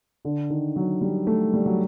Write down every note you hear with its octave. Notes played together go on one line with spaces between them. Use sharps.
D3
D#3
F#3
G3
A3
G3
F#3